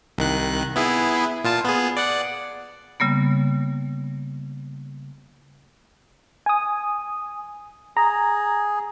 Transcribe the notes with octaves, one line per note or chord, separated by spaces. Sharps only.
C2 D#3 F#6
B3 E4 G#4
A#2 F4 A5
B3 G#4
D5 F#5
C#3 G3 A#3 B3
G#5 D#6
G#4 A#5